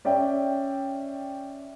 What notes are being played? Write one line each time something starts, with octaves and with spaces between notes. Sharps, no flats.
C#4 D5 E5 G5